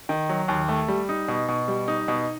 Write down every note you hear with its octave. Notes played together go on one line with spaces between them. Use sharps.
D#3
F#3
D#2
A3
G3
D#4
B2
B2
G3
D#4
B2